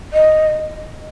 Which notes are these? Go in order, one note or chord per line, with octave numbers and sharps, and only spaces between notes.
D#5